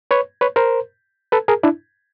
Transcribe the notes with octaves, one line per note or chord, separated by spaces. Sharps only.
B4 C#5
B4 C#5
A#4 C5
A4 B4
G#4 A#4
D4 E4